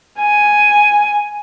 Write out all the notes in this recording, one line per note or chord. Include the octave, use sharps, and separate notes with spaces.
G#5